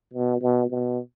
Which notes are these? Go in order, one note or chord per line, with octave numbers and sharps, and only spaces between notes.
B2
B2
B2